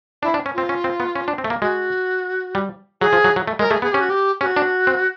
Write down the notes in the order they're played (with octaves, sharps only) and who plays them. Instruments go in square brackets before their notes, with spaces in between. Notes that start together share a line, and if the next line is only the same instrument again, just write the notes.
[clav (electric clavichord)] D4 [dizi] E4
[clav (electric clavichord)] D4
C#4
[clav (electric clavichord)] C4 [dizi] F4
[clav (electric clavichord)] C#4
C4
B3
C#4
D4
C4
A3
A#3
[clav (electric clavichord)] G#3 [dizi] F#4
[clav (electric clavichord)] G3
[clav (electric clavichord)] F#3 [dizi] G#4
[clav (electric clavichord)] F3
F#3
F#3
A3
[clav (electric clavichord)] G#3 [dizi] A#4
[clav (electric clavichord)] A3 [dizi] G#4
[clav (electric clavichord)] B3 [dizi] G#4
[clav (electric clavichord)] C#4 [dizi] G4
[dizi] F#4
G4
[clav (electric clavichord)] C#4 [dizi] G4
[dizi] F#4
[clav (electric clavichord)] D4
C4